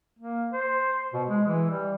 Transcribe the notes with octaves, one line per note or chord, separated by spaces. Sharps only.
A#3
C5
B2
G#3
E3
G3